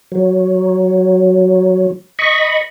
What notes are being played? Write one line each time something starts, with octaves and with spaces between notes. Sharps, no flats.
F#3
D#5 B5 C#6